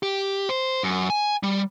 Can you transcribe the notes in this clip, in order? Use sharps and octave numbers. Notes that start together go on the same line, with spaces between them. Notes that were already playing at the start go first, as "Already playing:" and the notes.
G4
C5
F#2
G#5
G3